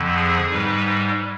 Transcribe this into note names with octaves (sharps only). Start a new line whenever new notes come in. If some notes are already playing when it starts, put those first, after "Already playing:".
Already playing: F2 D3 F3
G#4
G#2 G3 B4